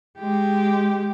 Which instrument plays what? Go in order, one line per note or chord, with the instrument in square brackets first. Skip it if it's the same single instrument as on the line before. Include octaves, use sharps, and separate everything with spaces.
[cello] G#3 G4